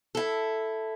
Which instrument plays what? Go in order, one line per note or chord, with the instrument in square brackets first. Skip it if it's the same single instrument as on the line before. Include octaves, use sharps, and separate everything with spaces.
[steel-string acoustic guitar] E4 A4